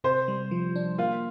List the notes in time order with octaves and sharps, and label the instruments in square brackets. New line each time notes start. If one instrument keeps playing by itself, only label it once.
[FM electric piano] C3 [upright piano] C5
[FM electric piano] G3
F3
D4
[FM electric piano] A#3 [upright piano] F4